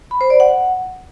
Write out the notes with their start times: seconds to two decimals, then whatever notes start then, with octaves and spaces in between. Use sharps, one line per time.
0.11 B5
0.21 C5
0.30 D5
0.40 F#5